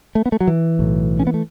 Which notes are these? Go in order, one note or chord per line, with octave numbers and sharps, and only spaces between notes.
A3
B3
A3
F#3
E3
B1 A2
C#4
B3
A3